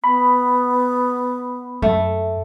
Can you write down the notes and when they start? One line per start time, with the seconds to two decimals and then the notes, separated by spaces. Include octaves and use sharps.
0.04 B3 B5
1.82 F#2 A3